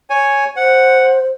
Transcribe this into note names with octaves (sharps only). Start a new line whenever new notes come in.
C#5 G#5
C5 F#5